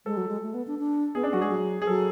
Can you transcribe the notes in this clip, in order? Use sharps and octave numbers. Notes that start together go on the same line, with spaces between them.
G#3 A4
F#3
G#3
A3
B3
D4
D4
B3 G#4
C#4 D4
F#3 F#4
G#3 G#4
F#3
G#4
F#3 A4